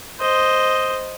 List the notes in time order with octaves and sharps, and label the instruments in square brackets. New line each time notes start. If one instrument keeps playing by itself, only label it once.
[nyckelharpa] C5 D#5